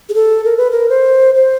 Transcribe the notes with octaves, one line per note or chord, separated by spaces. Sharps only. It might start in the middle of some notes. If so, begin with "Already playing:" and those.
G#4
A4
A#4
B4
A#4
C5
C5